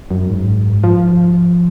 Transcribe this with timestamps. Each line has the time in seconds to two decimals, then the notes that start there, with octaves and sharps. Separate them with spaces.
0.11 F#2
0.29 G#2
0.84 F3